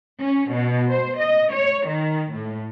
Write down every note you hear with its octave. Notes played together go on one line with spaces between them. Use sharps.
C#4
B2
C5
D#5
C#5
D#3
A2